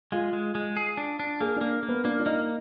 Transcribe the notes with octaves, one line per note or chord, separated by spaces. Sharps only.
G#3 F4
G#3
G#3
G#4
D4
D4
A#3 G#4
A#3 D4
A#3
B3
A#3 D4
D4
A#3 D#4